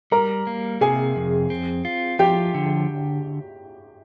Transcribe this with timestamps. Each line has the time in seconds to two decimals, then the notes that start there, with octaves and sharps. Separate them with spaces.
0.12 G3 A#4 A#5
0.47 A#3
0.81 C3 G#4 G#5
1.16 F2
1.50 C4
1.85 F4
2.19 F3 G4 G5
2.54 D3